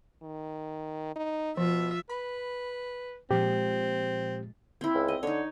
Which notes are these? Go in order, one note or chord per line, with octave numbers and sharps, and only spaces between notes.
D#3
D#4
B2 F3 F4 E5
B4 B5
A#2 F3 G#3 C4 G4
C4 E4
C#2
D#5
D3 D#4 C#5